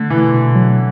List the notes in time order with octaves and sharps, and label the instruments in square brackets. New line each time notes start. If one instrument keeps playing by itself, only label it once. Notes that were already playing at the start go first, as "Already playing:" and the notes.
Already playing: [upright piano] D3 [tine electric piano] A3
[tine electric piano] B2 [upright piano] E3
[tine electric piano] B2
F#3